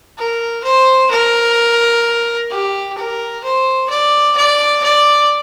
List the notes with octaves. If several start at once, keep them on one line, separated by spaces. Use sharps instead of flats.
A#4
C5
A#4
G4
A#4
C5
D5
D5
D5